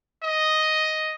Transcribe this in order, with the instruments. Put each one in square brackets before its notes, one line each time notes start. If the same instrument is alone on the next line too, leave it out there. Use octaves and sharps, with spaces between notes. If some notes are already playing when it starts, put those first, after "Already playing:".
[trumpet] D#5